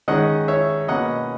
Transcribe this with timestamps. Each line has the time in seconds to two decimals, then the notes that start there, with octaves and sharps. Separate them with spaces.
0.08 D#3 G#3 C#4 D#5 F#5
0.48 C#5 E5
0.88 B2 A#3 C#4 D#5 F#5